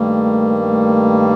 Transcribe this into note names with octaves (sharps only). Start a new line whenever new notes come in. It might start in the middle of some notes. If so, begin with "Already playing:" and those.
Already playing: G2 D#3 G3 A3 A#3
A3